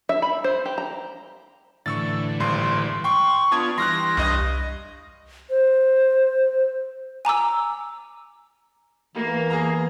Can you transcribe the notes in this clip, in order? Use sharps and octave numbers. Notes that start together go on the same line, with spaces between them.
E5
B5
C5
G4
A#5
A2 D3 E3 C#6 E6 A6
G#1 G2 C6
G5 C6 C#6
B3 D4 F4 A5 D#6 G#6
E3 G3 C6 F6 F#6 A#6
C2 G2 D#5 D#6
C5
G#5 A#5 D6 E6
E3 A#3 B3 A#4
G#4 F5 A#5